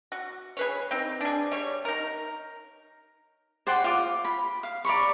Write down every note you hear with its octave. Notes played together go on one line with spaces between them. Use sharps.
F#4
G#4 B4 C#5
C4 D#4
D4 G#4
G3 C#5
D#4 A#4
C5 D5 F#5 G5
F4 D6
B5
F5
D5 A#5 B5 C#6